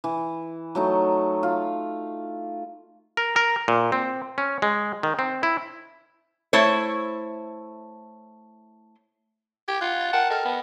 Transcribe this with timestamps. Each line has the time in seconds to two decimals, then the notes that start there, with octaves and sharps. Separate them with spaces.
0.04 E3
0.75 F#3 A3 D#4
1.43 F4
3.17 A#4
3.36 A#4
3.68 A#2
3.92 C4
4.38 C#4
4.62 G#3
5.03 D#3
5.19 C4
5.43 E4
6.53 A3 E4 C5 C#5
9.68 G4 G#6
9.81 F4 F#5 F#6
10.01 A6
10.13 A#4 F#5 G5 A5
10.30 A4 D#5 F6
10.45 B3